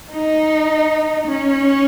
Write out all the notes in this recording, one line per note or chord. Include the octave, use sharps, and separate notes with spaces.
D#4
C#4